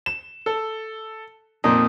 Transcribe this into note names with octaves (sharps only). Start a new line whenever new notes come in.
E7
A4
F2 A#2 D#4